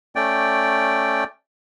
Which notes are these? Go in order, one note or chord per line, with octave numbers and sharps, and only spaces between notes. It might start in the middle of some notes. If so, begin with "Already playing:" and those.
A3 C#4 D5 G5